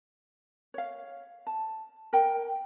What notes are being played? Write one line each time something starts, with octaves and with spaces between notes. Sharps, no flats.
C#5 F5
A5
A#4 G5